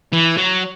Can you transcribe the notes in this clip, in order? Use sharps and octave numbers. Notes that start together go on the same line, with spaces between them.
E3
F#3